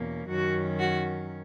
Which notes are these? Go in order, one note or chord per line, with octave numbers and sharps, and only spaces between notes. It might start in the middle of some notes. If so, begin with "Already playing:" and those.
Already playing: E2 B2 A#3 C#4
F#2 D#3 F#3 C#4 F#4
F#4